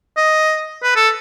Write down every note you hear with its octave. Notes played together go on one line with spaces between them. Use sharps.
D#5
B4
A4